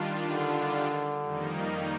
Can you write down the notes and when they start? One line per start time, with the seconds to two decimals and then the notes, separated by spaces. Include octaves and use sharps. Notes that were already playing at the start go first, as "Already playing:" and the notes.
Already playing: D#3 G3 D4 F4
0.29 D3
1.22 F2 D#3 G3 A#3 D#4